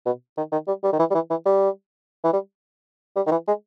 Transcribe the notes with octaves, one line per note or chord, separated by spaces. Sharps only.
B2
D#3
D#3
G3
G3
D#3
E3
G3
E3
E3
G3
E3
G3
G3
D#3
E3
G#3